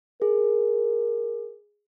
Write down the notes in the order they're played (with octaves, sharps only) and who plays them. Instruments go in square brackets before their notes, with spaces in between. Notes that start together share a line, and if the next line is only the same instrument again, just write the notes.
[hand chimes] G#4 [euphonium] A#4